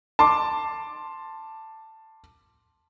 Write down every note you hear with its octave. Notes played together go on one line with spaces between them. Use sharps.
A5 C6 D6